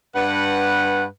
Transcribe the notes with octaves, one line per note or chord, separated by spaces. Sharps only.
G2 B4 F#5